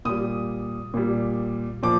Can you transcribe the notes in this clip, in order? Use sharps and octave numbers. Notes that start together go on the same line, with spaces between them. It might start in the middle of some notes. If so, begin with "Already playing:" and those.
A#2 G3 D#6
A#2 G3
A#2 F3 D6